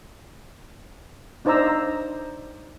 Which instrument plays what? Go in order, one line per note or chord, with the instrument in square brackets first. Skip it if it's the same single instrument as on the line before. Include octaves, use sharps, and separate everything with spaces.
[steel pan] D4 D#4 C5 D5 A#5 E6